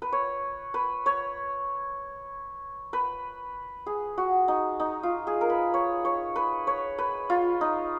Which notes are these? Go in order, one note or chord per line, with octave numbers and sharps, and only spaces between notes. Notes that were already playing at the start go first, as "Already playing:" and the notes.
B4
C#5
B4
C#5
B4
G#4
F#4
D#4
D#4
F4
G#4
A#4
B4
C#5
C#5
B4
C#5
B4
F4
D#4